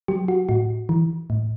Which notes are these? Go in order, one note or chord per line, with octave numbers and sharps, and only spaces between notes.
F#3 G4
F#4
A2 F#4
E3
A2